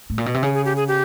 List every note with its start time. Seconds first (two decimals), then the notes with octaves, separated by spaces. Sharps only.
0.10 A2
0.18 A#2
0.26 B2
0.34 C3
0.43 C#3 G#4
0.54 G#4
0.65 G4
0.76 G#4
0.88 G4